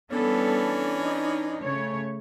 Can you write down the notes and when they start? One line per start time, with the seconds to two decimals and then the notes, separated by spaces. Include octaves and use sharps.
0.11 E3 G3 B3 C#4 D4 A4
1.00 D#4
1.61 C#3 A3 C#5